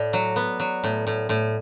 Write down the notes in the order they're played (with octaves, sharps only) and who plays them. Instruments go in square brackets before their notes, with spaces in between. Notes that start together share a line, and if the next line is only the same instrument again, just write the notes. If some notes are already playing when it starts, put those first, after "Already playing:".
Already playing: [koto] A2 [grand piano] D5
[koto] F#3
B3
F#3
A2
A2
A2